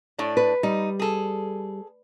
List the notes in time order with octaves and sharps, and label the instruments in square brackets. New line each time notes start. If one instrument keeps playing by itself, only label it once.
[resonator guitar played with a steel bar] A2 D4
[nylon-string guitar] B4
[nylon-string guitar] G3 [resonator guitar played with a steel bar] D#4
[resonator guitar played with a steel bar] G#4 A4